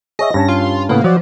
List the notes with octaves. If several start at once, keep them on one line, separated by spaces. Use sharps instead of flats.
G#4 C#5 D#5 E5
G2 C#4 A5 A#6
F4
A2 C#3 A#3 B3
F3 F#3 D5 F#5